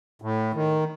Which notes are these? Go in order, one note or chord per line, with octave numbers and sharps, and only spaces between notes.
A2
D#3